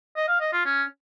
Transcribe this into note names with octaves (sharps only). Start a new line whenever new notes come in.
D#5
F5
D#5
F4
C#4